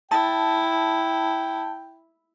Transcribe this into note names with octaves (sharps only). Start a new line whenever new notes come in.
E4 G5 A5